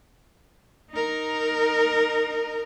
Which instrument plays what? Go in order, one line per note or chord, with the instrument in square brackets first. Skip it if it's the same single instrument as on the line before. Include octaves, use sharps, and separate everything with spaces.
[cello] D#4 A#4